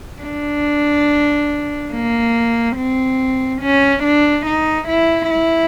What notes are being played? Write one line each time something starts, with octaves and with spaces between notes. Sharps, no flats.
D4
A#3
C4
C#4
D4
D#4
E4
E4